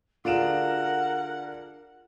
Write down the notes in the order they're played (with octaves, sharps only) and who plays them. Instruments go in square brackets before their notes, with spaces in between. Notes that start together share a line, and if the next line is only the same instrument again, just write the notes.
[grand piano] D3 D7 E7 [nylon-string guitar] F4 F#4 G#4 [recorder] A#4 [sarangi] F#5